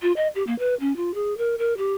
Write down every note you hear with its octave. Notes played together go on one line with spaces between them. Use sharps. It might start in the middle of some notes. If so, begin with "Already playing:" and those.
F4
D#5
G4
A#3
B4
C#4
F4
G#4
A#4
A#4
G4